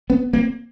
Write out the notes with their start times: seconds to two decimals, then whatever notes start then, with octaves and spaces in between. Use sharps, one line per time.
0.10 B3 C#4
0.33 A#3 C4